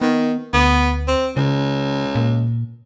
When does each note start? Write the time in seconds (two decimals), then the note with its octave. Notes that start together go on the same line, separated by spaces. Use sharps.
0.01 D#3 B3
0.53 D2 B3
1.08 C4
1.37 C#2 C#3
2.15 A#2